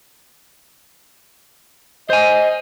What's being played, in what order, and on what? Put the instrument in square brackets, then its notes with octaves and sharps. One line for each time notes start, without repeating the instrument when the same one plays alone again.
[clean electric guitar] C5 G#5 [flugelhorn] D#5